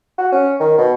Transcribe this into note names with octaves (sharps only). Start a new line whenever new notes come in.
F#4
C#4
D#3
B2